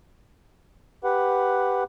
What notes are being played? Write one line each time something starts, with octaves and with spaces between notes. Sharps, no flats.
G4 B4 F#5